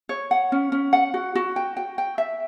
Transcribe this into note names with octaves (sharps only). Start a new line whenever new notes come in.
C#5
F#5
C#4
C#4
F#5
F#4
F#4
G5
G5
G5
E5